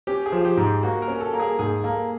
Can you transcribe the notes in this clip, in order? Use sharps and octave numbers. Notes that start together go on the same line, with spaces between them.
C#4 G4
G#4
F3
G4
G#2
A#3 F#4
A#4
C#4
A4
A#3
G#4
G#2 G#4
A#3 A4